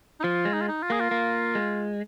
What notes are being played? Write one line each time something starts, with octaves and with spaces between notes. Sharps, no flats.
D#4
F3 F4
G#3
D#4
F4
D#4
F4
A#3 G#4
F4
A#3
G#3